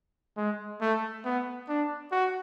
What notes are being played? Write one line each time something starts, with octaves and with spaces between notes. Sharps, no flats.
G#3
A3
B3
D4
F#4